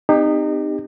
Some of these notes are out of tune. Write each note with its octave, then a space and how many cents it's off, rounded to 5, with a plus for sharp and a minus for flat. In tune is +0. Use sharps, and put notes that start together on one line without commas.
C4 -40 D#4 -25 G4 +25